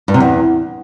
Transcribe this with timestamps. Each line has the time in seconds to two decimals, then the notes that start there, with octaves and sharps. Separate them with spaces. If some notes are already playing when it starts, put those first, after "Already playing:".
0.08 G2
0.14 C3
0.20 E2